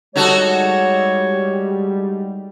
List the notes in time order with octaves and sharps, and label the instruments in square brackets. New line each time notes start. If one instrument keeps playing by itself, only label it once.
[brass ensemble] G3 G#3 [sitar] D#4 F#4 A4 [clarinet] C#5